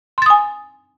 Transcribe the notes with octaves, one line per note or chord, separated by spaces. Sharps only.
G#5 C6 D#6 A6